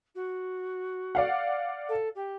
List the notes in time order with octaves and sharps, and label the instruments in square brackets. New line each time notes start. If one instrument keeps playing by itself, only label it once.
[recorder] F#4
[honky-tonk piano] D5 F5 F#5
[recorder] A4
G4